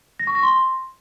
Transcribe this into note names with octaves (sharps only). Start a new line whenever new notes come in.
A#6
C#6
A#6
C6